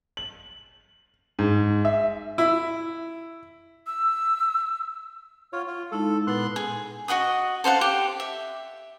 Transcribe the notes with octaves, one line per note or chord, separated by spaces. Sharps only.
F#7
G#2
E5
E4
E6
F4 C#5 F#5 F6
F4
G#3 D#4 E4 A4
A#2 B3 C6 F#6 A6
G#4
F#4 D#5 F#5 D#6
A4 C5 F5 F#5
G4
E5